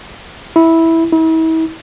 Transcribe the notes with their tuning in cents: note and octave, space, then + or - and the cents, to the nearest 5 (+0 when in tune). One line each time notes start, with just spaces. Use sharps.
E4 -10
E4 -40